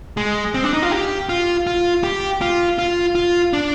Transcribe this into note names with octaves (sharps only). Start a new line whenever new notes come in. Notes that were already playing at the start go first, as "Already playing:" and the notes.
G#3
C4
D4
D#4
F4
G4
F4
F4
G4
F4
F4
F4
D4